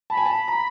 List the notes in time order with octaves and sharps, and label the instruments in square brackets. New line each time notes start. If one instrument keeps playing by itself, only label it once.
[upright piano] A5 [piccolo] B5
[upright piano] G#5
A5
A#5